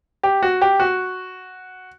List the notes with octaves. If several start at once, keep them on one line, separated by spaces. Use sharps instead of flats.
G4
F#4
G4
F#4